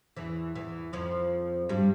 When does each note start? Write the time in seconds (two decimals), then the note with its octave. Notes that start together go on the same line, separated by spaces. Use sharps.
0.17 E2 E3
0.55 E2 E3
0.93 F2 F3
1.69 G2 G3